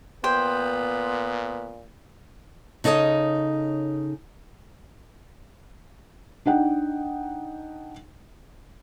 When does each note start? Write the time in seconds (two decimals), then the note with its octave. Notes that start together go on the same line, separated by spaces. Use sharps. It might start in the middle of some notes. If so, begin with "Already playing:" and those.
0.24 A#2 B3 C5 G5
2.84 C#3 D#4 A4 C#5 D#5
6.46 D4 D#4 F#5 G5